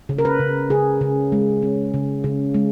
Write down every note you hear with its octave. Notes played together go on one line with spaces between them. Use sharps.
C#3
A#4
B4
C#3
C#3 G#4
C#3
G#3
C#4
C#3
C#3
G#3